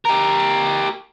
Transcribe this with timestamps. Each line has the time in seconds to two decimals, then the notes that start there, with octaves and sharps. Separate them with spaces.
0.05 G4 A#4